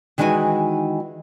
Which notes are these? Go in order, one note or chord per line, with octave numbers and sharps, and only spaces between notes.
D#3 E3 G#3 D#4 F#4 G#5